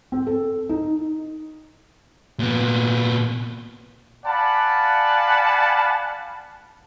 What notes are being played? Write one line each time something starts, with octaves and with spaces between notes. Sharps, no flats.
C4
A4
D#4
A#2 B3
D5 F5 F#5 G#5 A5 B5